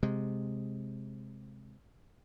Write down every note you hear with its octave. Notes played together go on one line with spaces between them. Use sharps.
C3 G#3